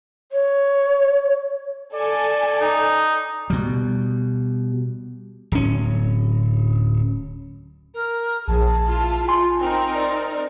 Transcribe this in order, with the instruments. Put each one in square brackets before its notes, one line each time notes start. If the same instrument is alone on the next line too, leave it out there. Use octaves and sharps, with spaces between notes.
[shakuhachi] C#5
[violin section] A4 G#5 [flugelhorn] D5
[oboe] D#4
[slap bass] B2 G3
D1 C#4
[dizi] A#4
[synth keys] A#1 [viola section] G#4 [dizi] A5
[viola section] E4 F4
[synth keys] G#5 C6
[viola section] C4 D#4 A#4 [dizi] G5
[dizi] D5